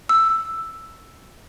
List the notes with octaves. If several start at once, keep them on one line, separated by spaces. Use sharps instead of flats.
E6